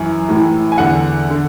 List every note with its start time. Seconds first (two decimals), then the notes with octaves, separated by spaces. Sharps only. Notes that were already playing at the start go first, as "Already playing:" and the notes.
Already playing: F#2 E3 G#5
0.28 A2 E3
0.72 G#5
0.78 E2 D3 F#5
1.30 D3